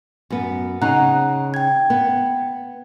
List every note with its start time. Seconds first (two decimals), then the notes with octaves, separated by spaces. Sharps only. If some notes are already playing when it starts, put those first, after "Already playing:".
0.30 F#2 B3
0.81 C#3 D#4 F#5 A#5 F#6
1.54 G5 G#6
1.90 B3